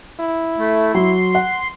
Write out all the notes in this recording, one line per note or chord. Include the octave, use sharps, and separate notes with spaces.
E4
A3
F#3 C6
F#5